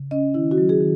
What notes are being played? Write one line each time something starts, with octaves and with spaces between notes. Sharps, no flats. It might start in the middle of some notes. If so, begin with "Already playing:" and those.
Already playing: C#3
C#4 D#5
D#3 E4
F#4
F#3
G#4
D#3